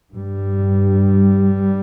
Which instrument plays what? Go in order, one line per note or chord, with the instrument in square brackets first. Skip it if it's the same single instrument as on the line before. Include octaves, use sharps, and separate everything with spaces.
[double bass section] G2 G3